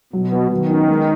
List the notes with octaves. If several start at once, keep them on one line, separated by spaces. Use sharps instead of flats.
B2 F#3
B3
D#3 F#3
C#4
G#3